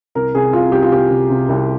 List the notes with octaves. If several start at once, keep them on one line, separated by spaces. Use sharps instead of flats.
C2 A#4
C3 G#4
C2 F4
C2 G4
F4
C3 G4
C3
C3
C2